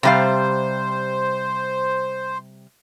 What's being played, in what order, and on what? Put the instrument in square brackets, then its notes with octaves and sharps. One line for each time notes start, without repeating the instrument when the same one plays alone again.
[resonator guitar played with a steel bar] C3 G3 F5 [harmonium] C5